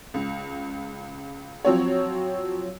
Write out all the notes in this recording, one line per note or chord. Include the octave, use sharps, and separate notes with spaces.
C#2
F3 F#3 C4 C#5